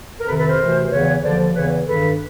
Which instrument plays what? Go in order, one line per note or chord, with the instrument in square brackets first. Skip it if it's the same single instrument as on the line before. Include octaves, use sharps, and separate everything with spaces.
[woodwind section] A#4
F2 C3 D#3 A4 B4
A4 B4
A#4 C5
D2 C3 E3
E2 C#3 E3 B4 C#5
D#2 D3 F3 C5 D5
E2 C#3 E3 B4 C#5
G2 D#3 A4 B4